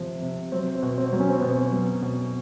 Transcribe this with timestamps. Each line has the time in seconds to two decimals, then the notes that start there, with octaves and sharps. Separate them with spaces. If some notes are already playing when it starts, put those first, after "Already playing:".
Already playing: C3 F3
0.22 C3
0.52 F#3 C4
0.75 C4
0.82 B2
0.98 C4
1.13 F#3
1.20 C#4
1.30 C4
1.40 B2 B3
1.50 C4
1.72 F#3
2.02 B2